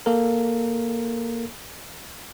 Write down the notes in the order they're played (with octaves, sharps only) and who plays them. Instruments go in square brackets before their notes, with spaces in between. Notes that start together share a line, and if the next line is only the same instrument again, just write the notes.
[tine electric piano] A#3 A4 A#4